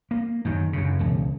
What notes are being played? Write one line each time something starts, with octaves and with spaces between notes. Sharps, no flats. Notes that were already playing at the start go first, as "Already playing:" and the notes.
A#3
F#2 D#3
F#2 C#3
E1 C#2